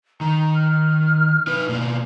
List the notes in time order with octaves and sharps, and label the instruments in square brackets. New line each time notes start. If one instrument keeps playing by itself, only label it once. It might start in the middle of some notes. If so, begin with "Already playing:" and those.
[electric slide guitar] D#3 [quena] A#5
[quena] F6
[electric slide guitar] D#4 B4
B2 A#3